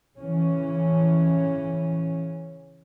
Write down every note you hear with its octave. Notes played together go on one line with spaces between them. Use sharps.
C#3 E3 C#4